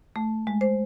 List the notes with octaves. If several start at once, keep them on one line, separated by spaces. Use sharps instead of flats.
A3
G#3
C5